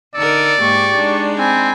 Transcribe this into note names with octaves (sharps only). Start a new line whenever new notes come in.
D3 D#4 A#4 D5 E6 C#7
G#2 G#3 A#3 G4 C#6
G#3 D4 D#4
C4 G#5 B5